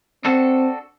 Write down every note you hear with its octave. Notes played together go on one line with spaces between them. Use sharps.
C4 D4 F#4 A4